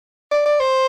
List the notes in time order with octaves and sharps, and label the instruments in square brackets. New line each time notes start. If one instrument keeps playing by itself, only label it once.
[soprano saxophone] D5
D5
C5